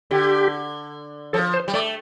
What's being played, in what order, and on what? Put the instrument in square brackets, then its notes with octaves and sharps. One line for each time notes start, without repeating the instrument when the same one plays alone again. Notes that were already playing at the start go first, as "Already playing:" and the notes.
[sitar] D3 [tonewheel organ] G4
[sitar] F3 [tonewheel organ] A4
[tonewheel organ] C5
[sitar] G3
[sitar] A3 [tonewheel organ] D5